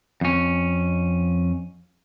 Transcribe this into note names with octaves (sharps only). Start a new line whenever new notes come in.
F2 C#4